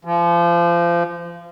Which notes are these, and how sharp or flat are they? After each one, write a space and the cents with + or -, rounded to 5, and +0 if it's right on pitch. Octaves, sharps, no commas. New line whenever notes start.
F3 -30